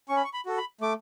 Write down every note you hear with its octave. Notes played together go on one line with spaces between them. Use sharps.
C#4 C#6
B5
C#6
B5
F#4 A4
B5
A3 D6